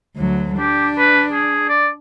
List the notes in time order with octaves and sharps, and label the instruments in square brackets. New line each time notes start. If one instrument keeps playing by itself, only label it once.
[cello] D2 F#3
[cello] D4 [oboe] G4
[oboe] B4
G#4
D5